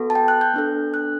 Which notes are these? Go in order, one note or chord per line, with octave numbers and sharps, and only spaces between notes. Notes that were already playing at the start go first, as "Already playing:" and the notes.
Already playing: B3 F#4 A4
A5
G5
F#6
G6
B3 D4 A4
F#6